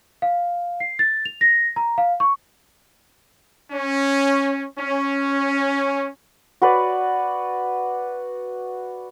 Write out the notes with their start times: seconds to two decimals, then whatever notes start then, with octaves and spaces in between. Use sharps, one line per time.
0.22 F5
0.80 C7
0.99 A6
1.25 F7
1.41 A#6
1.76 A#5
1.98 F5
2.20 C#6
3.72 C#4
4.78 C#4
6.62 F#4 B4 D5